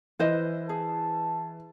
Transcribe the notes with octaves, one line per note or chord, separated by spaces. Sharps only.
E3 B4 C5 D#5
G#4 A5